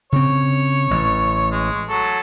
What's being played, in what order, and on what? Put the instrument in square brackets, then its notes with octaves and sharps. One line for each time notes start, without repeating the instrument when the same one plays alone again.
[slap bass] C#3 C4 [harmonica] C#5
[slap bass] A1
[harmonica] G#3
F#3 A4